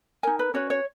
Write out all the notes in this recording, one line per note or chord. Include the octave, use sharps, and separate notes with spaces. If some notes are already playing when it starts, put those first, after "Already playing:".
D#4 A#4 G#5
B4
C#4 F#4 B4 C#5
C#5